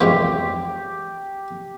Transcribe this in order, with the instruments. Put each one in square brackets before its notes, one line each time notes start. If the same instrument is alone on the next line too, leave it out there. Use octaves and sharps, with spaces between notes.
[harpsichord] F2 G#2 E3 [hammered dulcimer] G4